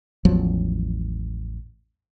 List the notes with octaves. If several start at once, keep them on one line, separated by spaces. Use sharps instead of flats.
A1 E2 F3 F#3